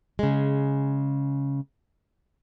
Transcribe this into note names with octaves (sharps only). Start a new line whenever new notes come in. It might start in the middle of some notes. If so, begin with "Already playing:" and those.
C#3 G#3